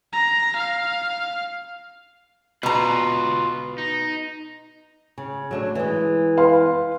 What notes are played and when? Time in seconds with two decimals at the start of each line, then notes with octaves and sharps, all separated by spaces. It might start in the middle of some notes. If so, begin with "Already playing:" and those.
0.13 A#5
0.56 F5
2.63 B2 F4 B4 A#5
3.78 D#4
5.18 C#3
5.51 F#3 A3 D4
5.75 E3 G#3
6.37 B4 F5 C6